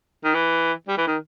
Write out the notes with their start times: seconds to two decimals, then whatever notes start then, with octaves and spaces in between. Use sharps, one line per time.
0.24 D#3
0.35 E3
0.88 G3
0.98 E3
1.07 D#3